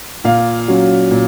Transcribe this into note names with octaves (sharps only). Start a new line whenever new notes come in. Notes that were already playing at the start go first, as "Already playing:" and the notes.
A#2 F5
F#3 C#4
A#2